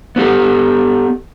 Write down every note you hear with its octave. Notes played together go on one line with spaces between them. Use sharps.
B3 C#4 F4 G4 A4